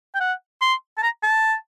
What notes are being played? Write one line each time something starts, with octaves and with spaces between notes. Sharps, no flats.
G5
F#5
C6
A5
A#5
A5